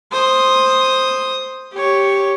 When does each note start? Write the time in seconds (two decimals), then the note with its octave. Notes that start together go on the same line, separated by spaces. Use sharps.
0.12 C5 D#6
1.73 G4 C#5